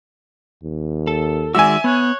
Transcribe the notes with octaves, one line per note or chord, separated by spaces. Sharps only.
D#2
A4
D#3 G#3 F#4 D5 E5 G#5 E6
B3 C#5 F#6